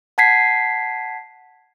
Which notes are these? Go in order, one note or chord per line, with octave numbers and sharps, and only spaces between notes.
F#5 A5 G#6 B6 C7